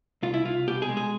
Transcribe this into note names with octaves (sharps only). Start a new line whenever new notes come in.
C2 F4
E4
C2 F4
B2 G4
G#4
G#3
G#4